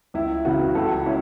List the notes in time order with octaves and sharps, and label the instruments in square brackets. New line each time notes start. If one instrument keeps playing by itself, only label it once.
[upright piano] C#2 E4
C#3 E3 F#4
C#2 F#4 A4
C#4 E4